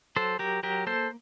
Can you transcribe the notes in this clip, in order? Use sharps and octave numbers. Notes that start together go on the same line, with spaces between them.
F#3 A4 C5
F#3 G4 A#4
F#3 G4 A#4
A#3 A4 C5